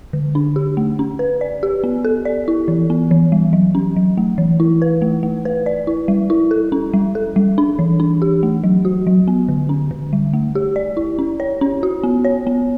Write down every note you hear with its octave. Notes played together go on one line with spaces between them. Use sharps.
D3
D4
G4
A3
C#4
B4
D5
G4
B3
A4
D5
E4
E3
B3
E3
G3
F#3
C#4
F#3
A3
E3
E4
B4
A3
A3
B4
D5
E4
G3
E4
A4
C#4
G3
A4
G3
D4
E3
D4
G4
A3
F#3
F#4
F#3
B3
D3
C#4
D3
G3
A3
G4
D5
E4
C#4
C#5
C#4
F#4
B3
C#5
B3